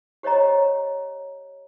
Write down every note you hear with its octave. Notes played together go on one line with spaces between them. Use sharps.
G4 C5 C#5 D#5 A#5